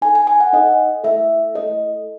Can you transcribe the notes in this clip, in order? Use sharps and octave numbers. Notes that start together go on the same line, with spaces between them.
D#4 A4 G#5
G#5
G#5
F#5
D#4 A4 D#5
A3 E4 A4 E5
A3 E4 A4 D#5